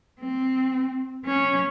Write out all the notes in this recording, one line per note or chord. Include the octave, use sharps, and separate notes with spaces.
C4
C#4